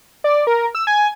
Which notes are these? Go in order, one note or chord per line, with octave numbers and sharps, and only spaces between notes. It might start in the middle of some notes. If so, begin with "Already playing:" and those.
D5
A#4
E6
G#5